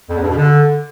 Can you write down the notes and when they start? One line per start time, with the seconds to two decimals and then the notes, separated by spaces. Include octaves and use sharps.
0.09 F2
0.15 E2
0.22 G2
0.29 B2
0.36 D3